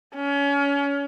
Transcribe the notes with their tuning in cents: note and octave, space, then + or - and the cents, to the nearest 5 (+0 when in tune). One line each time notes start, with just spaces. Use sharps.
C#4 +30